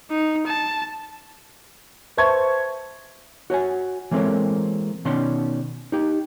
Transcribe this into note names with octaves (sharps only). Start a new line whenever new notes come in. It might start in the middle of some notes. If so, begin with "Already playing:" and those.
D#4
A5
B4 C5 E5 A5 C#6 G#6
F#4 C#5 F#5 G#5
E3 G#3 A#3 C4 A4 C#5
B2 D#3 C#4 D5 C6
D#4 G4